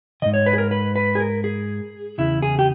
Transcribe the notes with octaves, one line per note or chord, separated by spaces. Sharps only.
G#2 D#3 D#5
C#5
B4
G#4
A#4
B4
B4
G#4
A#4
G#4
E2 C#3 E4
G#4
G4